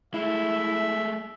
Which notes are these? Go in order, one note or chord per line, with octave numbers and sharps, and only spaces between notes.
G#3 A3 E4 E5